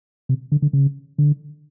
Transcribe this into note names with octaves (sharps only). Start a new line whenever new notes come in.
C3
D3
D3
C#3
D3